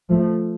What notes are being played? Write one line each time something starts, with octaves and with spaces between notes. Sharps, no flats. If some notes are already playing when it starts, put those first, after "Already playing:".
F3 A3